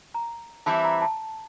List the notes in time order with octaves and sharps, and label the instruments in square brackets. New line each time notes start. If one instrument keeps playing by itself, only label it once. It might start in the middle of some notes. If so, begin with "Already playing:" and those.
[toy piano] A#5
[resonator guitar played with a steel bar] E3 G3 C4 E4 [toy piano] A5
[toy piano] A#5
A5